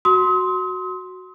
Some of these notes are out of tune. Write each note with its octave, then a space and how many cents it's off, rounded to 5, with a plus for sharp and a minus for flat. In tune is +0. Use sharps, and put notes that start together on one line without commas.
F#4 +0 C6 +0 D#6 +40